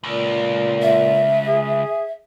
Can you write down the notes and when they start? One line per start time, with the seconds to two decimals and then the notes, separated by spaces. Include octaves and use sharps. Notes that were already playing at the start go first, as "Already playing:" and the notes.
0.04 C#2 A#2
0.82 E5
1.48 G#4